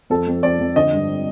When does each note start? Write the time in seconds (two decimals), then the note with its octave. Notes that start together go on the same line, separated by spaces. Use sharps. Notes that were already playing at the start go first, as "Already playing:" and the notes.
0.10 F2 A4
0.27 F2
0.43 F2 D5
0.59 F2
0.76 D3 D#5
0.93 G2